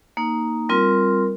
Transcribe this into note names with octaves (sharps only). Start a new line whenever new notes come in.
A#3 D#4
G3 C4 F4 A#4